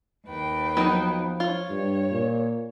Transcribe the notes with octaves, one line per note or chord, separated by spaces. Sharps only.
D#2 B4 G5
F3 F#3 B3 D#4
F4 C#5
G2
A#2